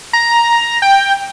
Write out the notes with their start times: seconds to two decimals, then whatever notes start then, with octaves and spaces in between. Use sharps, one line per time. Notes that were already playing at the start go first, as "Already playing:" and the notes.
0.13 A#5
0.82 G5